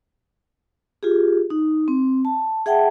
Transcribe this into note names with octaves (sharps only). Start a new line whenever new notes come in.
F4 G4 G#4
D#4
C4
A5
G#4 E5 F#5 G5 A5